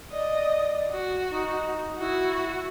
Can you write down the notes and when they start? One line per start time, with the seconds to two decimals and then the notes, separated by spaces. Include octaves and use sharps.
0.12 D5 D#5
0.92 F#4
1.30 D#4
1.98 E4 F#4